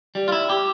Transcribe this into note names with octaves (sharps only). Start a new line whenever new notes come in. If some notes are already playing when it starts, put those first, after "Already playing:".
G3
F4
E4
G4